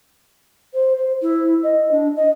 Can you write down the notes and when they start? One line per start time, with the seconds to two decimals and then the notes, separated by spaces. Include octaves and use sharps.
0.74 C5
0.97 C5
1.22 E4
1.63 D#5
1.91 D4
2.16 D#5